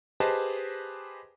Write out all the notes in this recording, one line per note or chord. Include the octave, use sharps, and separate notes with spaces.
G4 G#4 B4 C5 D#5 A5